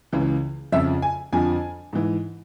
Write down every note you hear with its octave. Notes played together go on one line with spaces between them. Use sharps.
C#2 C#3 E3
F2 C#3 F3 E5
G#5
F2 D3 F3 G#5
G#2 E3